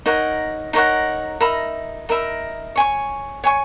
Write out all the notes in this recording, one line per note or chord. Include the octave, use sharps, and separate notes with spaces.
D#4 A#4 C#5 F#5
D#4 A#4 C#5 F#5
D#4 A#4 E5 B5
D#4 A#4 E5 B5
C#5 G#5 C#6
C#5 G#5 C#6